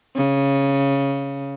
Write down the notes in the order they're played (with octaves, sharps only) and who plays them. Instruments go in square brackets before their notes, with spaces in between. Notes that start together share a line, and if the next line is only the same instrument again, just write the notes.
[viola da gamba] C#3